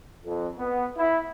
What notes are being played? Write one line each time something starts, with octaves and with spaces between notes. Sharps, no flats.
F2
B3
E4